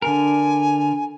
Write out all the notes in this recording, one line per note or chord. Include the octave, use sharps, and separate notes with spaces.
D3 A#4 G#5